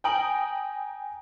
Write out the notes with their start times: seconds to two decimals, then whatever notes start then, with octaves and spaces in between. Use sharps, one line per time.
0.04 G5 G#5 A#5 D#6 D7 F#7